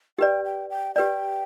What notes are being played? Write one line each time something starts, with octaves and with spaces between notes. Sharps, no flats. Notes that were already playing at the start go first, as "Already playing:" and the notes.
G4 B4 D5 G5
G5
G5
G4 B4 D5 G5